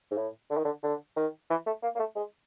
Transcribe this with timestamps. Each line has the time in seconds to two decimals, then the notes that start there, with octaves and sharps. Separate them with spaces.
0.11 G#2
0.17 A2
0.51 D3
0.57 D#3
0.65 D3
0.83 D3
1.16 D#3
1.50 E3
1.66 A3
1.83 A#3
1.95 A#3
1.99 A3
2.16 G#3